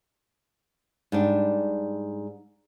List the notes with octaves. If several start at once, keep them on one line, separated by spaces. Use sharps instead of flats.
G#2 G3 D4